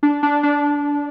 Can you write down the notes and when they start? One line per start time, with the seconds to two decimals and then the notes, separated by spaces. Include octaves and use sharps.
0.03 D4
0.23 D4
0.43 D4